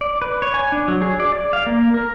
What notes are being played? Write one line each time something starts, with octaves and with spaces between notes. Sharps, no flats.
D5
B4
C#5
G#5
D4
F#3
G#4
D5
D5
F5
A#3
A#4